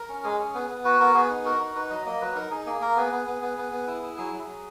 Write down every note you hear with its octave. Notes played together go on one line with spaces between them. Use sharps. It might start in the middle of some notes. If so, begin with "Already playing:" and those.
Already playing: A#4
C#4
G#3 G#4
C#4
B3 G#4
B3
F#4 B4
B3 A#4
B3 G#4
D#4
F#4 A#4
D#4
D#4 B4
F#3 D#5
A#3 D#5
F#3 B4
D#4 A#4
D#4 G#4
A#3 G#4
A#3 A#4
B3 G#4
B3
B3
B3
B3
B3
E4
E4
F#3 G#4
F#3
F#3